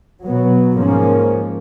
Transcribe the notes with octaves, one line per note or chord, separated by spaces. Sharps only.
B2 F#3 B3
G#2 F3 A#3 C#4